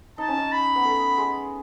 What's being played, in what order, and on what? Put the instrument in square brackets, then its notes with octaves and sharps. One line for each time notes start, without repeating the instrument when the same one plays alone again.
[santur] D#4 [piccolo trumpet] A5
[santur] C#4
D#4
[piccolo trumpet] B5
[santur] B3
A3
G#3